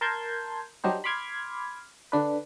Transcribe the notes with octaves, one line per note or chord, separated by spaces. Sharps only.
A#4 A5 C6 G6 G#6
F#3 G3 D4 D#4 G4 C5
B5 C6 D6 F6 G#6
D3 D4 B4